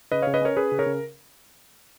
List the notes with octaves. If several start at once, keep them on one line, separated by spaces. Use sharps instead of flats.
C#3 B4 D#5
C#3 C#5 F5
B4 D#5
C#4 A#4 C#5
C#4 G#4 B4
C#3
A#4 C#5
C#3